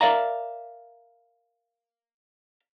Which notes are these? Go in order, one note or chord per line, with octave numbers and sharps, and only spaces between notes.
A#4 D5 E5 F5 A#5